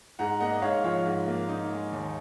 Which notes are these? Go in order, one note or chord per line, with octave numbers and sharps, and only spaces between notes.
G#2 F#5 A#5
A#3 D#5 F#5
D#5
G#2 C#5 F5
F3 C#5 F5
G#2
A#3
D#4
G#3
D#2